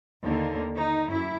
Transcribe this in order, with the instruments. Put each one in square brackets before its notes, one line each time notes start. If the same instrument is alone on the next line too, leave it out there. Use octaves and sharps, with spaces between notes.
[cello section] D#2 D3 A#3
D#4
F#2 E4